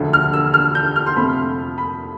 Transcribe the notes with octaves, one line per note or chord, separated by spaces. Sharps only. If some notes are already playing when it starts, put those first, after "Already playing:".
Already playing: E1 D2 D3 F3 A3
F6
E6
F6
G6
F6
C6
F2 C3 F3 A3 B5
B5